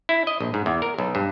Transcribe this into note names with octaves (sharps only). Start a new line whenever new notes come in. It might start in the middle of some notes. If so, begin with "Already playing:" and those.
E4
D#5
A#1
G#2
E2
A#4
B1
G2